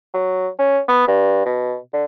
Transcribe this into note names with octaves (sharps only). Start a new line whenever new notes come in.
F#3
C#4
B3
G2
B2
D3